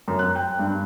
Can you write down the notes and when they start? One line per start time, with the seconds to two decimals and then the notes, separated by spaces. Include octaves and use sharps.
0.08 F#2
0.19 F#6
0.35 G5
0.59 G2